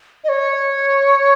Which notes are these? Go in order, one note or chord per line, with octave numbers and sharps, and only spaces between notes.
D#5
C#5